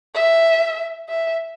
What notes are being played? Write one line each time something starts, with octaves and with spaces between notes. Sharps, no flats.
E5
E5